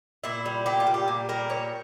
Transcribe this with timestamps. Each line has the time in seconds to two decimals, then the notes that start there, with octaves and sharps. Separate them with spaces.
0.24 A#2 E4
0.46 G3
0.66 A#2 G4
0.80 F4
0.87 G3
0.94 G4
1.08 A#2
1.29 G3 A#4
1.50 A#2 C#5